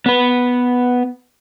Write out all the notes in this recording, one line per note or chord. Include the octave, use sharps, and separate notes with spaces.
B3 B4